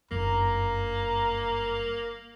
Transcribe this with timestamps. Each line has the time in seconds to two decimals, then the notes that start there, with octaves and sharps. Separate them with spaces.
0.11 F#1 G2 A#3 A#5